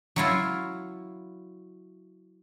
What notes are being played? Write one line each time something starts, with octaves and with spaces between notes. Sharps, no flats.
F#3 E4 F4